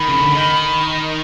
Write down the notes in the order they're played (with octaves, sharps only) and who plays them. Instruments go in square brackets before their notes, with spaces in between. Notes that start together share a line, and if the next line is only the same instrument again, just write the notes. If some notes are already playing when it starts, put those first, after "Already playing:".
Already playing: [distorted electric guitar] D#3 [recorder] B5
[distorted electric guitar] C#3
D3
D#3